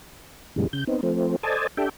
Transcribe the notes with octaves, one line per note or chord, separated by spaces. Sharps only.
F#2 A#2 C#3 E3 G3 G#3
C#3 G6
B3 C4 D#4
F3 A3 C4
A4 C5 D5 D#5 G#5 A5
D4 G4 A4 E5 G5